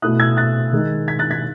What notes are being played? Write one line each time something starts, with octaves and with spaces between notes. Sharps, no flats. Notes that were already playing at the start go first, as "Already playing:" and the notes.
B2 A3 E4 D#6 F#6
E6 G#6
F#6 A6
D#3 G#3 D#4
G#6 B6
F#6 A6
G#6 B6